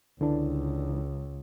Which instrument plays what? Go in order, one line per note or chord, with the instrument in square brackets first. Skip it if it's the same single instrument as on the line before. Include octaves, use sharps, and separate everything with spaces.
[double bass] C#2 [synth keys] D3 E3 D4